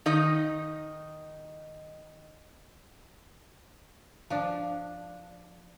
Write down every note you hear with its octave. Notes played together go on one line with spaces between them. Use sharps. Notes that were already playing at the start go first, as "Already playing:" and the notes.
D#3 D#4 D#5
F3 D4